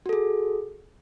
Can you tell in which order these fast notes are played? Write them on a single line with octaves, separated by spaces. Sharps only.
F#4 A4 G#4